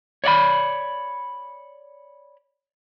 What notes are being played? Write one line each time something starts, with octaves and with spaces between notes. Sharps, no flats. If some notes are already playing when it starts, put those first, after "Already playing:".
C#5 D5 F5 B5